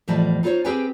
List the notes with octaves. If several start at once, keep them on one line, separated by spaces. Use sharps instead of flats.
E2 A2 F3 G3 D#5 A5
D#4 F4 G#4 C5 C#5
C4 G4 G#4 B4 G5 G#5